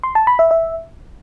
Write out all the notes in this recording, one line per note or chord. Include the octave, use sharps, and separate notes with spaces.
C6
A5
B5
E5
E5